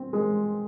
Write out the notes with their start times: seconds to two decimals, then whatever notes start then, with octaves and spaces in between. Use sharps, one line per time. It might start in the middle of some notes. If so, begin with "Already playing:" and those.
Already playing: C4
0.13 G#3